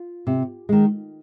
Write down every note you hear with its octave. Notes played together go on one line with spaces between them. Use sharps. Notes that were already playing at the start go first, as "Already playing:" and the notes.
Already playing: F4
C3
D#3 G#3